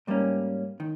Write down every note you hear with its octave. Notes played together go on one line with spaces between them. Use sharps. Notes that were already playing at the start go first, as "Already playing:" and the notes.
G#2 G3 A#3 C#4
D#3